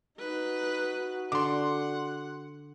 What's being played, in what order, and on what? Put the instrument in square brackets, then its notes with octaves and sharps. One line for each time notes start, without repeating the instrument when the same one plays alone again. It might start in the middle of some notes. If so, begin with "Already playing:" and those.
[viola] D#4 B4 [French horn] F#4
[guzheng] D3 D5 [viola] F#5 [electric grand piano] C6 D6